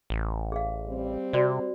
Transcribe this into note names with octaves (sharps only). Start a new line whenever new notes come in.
A1
G#4 F5
G3 C4
C3 F#4 C5 D5